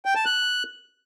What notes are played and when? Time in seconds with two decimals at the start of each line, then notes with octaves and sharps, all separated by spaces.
0.05 G5
0.15 A5
0.25 F#6